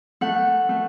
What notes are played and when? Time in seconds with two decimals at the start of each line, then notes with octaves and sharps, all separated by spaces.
0.21 A3 F#5
0.69 A3